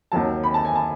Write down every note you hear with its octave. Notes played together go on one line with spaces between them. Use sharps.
D#2 D#3 F#3 A5
B5
A5
G#5
A5